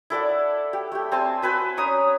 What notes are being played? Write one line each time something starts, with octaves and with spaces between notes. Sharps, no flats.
E4 A4 D5 F#5
G4
A3 G4
C4 G#5 A5 C6
F#4 B4 C5 G#5
C#4 A#5 D#6